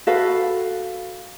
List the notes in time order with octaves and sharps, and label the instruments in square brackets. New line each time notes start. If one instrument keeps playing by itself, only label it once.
[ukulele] F#4 A4 B4 F5